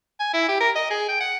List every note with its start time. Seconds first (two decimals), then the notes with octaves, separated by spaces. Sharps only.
0.20 G#5
0.33 E4
0.48 G4
0.60 A#4
0.75 D#5
0.90 G#4
1.08 G5
1.20 F#5